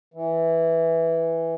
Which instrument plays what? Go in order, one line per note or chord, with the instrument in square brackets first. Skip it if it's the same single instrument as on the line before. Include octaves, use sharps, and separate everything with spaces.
[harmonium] E3